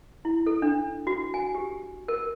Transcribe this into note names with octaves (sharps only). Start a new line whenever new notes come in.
E4
A4
D4
F#4
G#5
G4
A#4